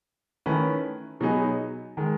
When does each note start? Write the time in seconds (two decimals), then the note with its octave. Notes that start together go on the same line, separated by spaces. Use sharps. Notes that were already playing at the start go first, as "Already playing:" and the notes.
0.46 D#3 A3 C#4 E4 B4
1.20 B2 F#3 B3 D#4 G#4
1.97 D#3 G#3